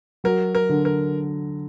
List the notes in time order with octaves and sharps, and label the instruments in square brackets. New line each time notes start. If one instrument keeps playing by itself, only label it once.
[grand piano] F#3 [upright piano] A#4
[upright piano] A#4
[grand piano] D3
[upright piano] A#4